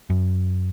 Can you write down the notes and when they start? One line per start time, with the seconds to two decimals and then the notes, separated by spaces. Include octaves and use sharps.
0.10 F#2